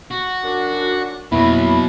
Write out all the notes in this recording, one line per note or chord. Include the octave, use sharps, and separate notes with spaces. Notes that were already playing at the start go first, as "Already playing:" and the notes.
F#4
F#2 D4
F2 B2 F#3 A#3 E4 B5